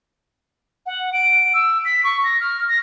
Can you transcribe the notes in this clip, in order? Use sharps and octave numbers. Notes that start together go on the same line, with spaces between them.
F#5
D7
E6
B6
C#6
A#6
F6
A#6